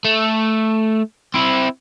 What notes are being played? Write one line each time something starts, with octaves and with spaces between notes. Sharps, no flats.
A3
C4 E4